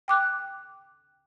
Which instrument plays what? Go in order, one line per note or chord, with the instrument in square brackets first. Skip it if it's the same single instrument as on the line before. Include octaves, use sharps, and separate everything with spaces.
[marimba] G5 D6 F#6